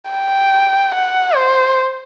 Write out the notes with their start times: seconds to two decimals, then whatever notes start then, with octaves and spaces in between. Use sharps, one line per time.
0.11 G5
0.94 F#5
1.35 C5